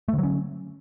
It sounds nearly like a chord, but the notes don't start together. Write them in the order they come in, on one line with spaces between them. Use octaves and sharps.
A3 D3 F#3 C#4